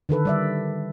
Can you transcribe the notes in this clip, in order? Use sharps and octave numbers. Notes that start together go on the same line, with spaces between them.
D3 D#3 A4 B4
G3 D5 E5